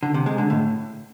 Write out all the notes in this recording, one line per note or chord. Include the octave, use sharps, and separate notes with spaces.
D3
C3
G#3
D3
A2